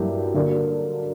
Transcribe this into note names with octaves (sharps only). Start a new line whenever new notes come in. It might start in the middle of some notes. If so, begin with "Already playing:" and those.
Already playing: G2 F#3 A#3 E4 G4
D3 F#3 A#3 D4